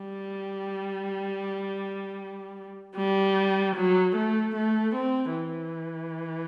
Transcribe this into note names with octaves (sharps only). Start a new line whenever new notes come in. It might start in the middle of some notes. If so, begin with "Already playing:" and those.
Already playing: G3
G3
F#3
A3
A3
C4
E3